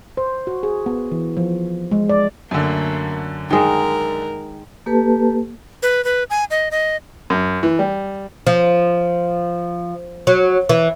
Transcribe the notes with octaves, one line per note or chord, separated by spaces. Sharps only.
C5
F#4
G#4
B3
E3
F3
G#3
D5
F#2 D3 A3 A#3
D#3 G#3 A#4
A#3 G4 A4 B4 A5
B4
B4
G#5
D#5
D#5
F#2
E3
G3
F3
F#3
E3